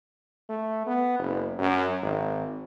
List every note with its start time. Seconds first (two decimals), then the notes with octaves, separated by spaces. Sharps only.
0.50 A3
0.87 B3
1.19 F#1
1.59 F#2
2.02 G#1